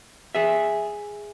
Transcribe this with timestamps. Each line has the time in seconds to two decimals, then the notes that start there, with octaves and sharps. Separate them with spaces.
0.35 G#4 E5